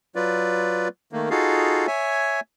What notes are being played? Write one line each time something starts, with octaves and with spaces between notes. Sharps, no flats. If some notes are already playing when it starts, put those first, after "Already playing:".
F#3 F4 B4 D5
D#3 A3 A#3
D#4 F4 F#4 G#4 A4 F5
C#5 E5 G#5